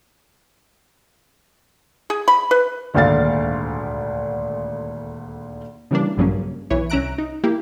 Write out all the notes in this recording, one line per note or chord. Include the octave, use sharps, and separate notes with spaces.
G#4
B5
B4
D#1 G#1 D2 A4 F5 A6
C#3 E3 G3 A#3 D4
A#1 G2 C#3 F#3 A#3 C#4
B1 E3 C#5
C2 C#4 E5 A#5 F#6 D7
D#4
A#3 E4 G4